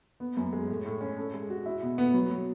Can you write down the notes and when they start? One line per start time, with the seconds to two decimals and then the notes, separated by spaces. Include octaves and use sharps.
0.20 B3
0.37 F#2
0.53 G#3
0.69 A2
0.85 A2
1.01 C#4
1.18 A4
1.34 G#3
1.50 F#4
1.66 E4
1.83 B2
1.98 B3
2.14 F#3
2.30 F#3